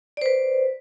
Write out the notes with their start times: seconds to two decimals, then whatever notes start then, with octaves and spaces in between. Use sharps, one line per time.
0.17 D5
0.21 C5
0.26 B4